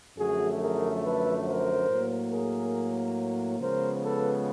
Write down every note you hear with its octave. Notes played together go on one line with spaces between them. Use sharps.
F#2 D3 F3 A3 F#4 G#4
G#4 A#4
A4 B4
A#4 C5
A2 F#3 A#3
G#4 A#4
C#3 F3 G#3 B3 A#4 C5
A4 B4